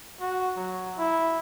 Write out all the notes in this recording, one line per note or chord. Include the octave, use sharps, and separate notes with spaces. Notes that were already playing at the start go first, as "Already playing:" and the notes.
F#4
F#3
E4